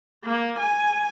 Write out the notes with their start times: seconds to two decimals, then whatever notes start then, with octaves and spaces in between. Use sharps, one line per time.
0.25 A#3
0.59 G#5